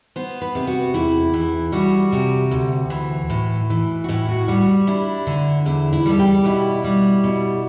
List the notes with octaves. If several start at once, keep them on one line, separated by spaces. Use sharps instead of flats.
B3 C5
B4
C3
F#4
E2 E4
E3
G3 F#4
C3
D2
E3
A2
E3
F#4
A2 E4
F#4
G3 F#4
D4 E4
D3
E2 E4
E4
G3 A4
G4
B2 E4
G3
B2